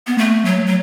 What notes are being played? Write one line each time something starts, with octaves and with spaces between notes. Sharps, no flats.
B3
A3
F#3
F#3